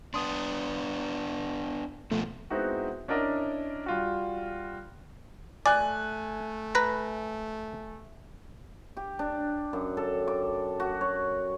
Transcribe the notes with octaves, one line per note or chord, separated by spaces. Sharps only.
B3 D4 C6 D#6
B2 F3 A3
G#3 B3 C4 D#4 E4 F#4
C#4 D4 E4 A#4 D5 D#5
G3 F4 F#4
A3 D5 G#5 F#6
B4 A#5
G4
D4
F#2
A4
D6
F#4
C#5